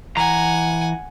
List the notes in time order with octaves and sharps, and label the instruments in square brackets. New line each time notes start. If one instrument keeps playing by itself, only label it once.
[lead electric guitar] E3 A#5 [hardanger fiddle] F#5 G#5